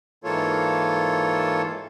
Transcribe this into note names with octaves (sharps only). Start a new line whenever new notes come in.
G#2 E3 A#3 F4 A4 C#5